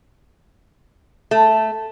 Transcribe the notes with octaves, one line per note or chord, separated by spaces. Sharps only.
A3